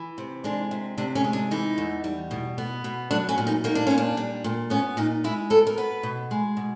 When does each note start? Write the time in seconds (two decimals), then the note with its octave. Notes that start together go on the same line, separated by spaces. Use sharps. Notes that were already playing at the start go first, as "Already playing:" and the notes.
Already playing: E3
0.18 C3
0.44 G#3 D4
0.71 C3
0.98 C3 D4
1.15 C#4
1.24 G#3
1.33 D4
1.51 E3 D#4
1.78 E2
2.04 G3
2.31 B2
2.58 B3
2.84 B2
3.11 F#3 D4
3.29 C#4
3.38 A#2
3.47 D#4
3.64 A#3 D#4
3.75 D4
3.87 A#2 C#4
3.98 D4
4.17 G3
4.44 A#2
4.70 B3 C#4
4.97 A#2 D#4
5.24 G#3 E4
5.50 B2 A4
5.67 A#4
5.77 B3 B4
6.03 B2
6.31 G#3
6.57 B2